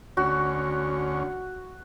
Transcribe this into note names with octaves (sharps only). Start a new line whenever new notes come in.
D2 C#4 F#4